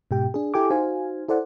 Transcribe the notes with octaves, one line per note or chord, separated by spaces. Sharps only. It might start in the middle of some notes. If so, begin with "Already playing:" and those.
G#2 B2 G4 G5
D4 G#4
E4 G4 A4 G5 G#5 D6
D#4 F#4 C5 F5 G#5
E4 A4 C5 D5 F#5